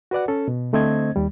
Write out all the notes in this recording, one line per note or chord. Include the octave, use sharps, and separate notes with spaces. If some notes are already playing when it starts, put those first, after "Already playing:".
F#4 B4 D5 F#5
C#4 A4
B2
D3 A3 C4 C5 D#5 G#6
D#2 G3